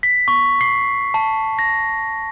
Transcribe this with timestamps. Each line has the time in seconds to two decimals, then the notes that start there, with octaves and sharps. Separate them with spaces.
0.03 B6
0.28 C#6
0.61 C7
1.14 A5
1.59 A#6